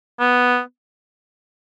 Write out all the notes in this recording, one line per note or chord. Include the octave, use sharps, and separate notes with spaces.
B3